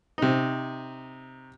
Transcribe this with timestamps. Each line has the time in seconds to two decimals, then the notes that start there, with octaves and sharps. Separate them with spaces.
0.18 C3 D#4